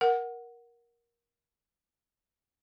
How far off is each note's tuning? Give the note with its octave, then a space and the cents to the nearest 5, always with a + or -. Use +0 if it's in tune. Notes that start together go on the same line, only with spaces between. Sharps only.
A#4 +15 F#5 +0